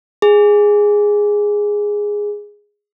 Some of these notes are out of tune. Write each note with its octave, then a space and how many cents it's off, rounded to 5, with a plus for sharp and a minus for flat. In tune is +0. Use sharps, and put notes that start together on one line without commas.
G#4 -5